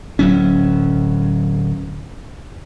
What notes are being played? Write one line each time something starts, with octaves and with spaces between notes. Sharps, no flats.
D1 F#3 C#4